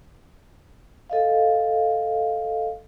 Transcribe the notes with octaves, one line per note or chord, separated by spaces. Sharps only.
A4 D#5 F5